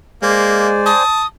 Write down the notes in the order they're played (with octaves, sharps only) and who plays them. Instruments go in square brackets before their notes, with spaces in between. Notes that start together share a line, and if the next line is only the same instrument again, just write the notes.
[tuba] G#3 [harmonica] A#3 [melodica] C5 D5 G#5
[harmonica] A5 [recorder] D#6